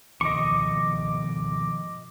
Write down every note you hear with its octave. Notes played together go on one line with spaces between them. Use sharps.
B2 D#3 F3 D#5 C#6 D6